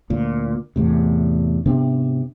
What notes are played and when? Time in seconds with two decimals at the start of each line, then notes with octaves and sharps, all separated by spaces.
0.10 D2 A#2
0.76 E2 A2 C3
1.66 G#2 C3 B3 D4